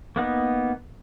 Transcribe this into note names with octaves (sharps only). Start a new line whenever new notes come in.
A#3 B3 D#4 B4